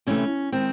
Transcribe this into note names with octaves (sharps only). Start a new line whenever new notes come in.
C3 E3 A3 C#4
D#3 G#3 C4